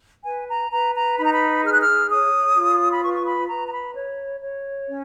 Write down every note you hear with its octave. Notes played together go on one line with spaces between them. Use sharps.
B4 G#5
A#5
B4 A#5
A#5
D#4 B5
A#5
B5
G#4 F6
F#6
F6
C#5 D#6
F4
B5
B4 C#6
C#6
B5
B4 A#5
A#5
B5
C#5
C#5
C#4